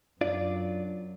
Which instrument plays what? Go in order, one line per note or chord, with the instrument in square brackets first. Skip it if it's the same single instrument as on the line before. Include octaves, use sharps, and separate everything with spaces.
[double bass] F#2 [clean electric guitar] D4 F4 D5